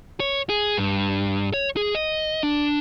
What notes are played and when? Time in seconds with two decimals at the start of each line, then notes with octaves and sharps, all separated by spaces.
0.20 C#5
0.49 G#4
0.78 G2
1.54 C#5
1.77 G#4
1.95 D#5
2.43 D4